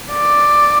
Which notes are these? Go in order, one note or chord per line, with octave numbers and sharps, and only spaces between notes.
D5